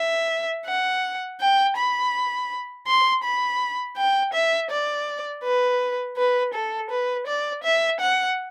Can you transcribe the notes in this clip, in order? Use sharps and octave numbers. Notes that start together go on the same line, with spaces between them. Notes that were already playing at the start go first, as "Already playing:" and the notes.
Already playing: E5
F#5
G5
B5
C6
B5
G5
E5
D5
B4
B4
A4
B4
D5
E5
F#5